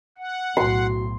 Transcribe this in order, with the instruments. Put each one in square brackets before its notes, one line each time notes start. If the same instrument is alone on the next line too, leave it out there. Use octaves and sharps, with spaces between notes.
[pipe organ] F#5
[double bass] B1 A2 [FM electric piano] F#4 [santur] C6